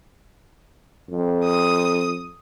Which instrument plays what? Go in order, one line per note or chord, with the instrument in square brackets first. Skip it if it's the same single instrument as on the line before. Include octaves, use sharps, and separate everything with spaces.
[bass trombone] F2
[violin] D#6